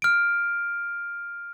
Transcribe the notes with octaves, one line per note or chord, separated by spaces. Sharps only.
F6 D7